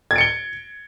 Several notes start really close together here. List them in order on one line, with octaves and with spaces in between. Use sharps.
G#6 A6 D7 C#7 G7